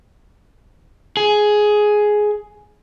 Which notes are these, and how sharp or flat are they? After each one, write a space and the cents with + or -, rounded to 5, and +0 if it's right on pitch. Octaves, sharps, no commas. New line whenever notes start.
G#4 +10